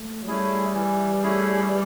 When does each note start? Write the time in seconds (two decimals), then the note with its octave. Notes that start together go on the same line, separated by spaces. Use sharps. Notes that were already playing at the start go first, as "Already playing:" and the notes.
Already playing: A3
0.23 F#3
0.27 G3 A3 C#4 E4 G#4
0.74 E3
1.22 A3 C#4 E4 G#4
1.69 E3